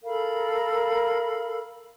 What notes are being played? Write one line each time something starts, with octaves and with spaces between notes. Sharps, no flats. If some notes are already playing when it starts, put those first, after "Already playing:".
A4 A#4 F5 B5